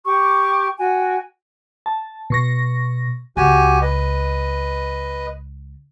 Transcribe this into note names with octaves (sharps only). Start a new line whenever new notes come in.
G4 C#6 D6
F#4 G5 G#5
A5
B2 C#6 A#6
C#2 F#4 G4 G#5
B4 D#5